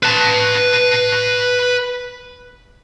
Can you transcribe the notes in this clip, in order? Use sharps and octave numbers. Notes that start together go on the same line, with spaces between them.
B4 A5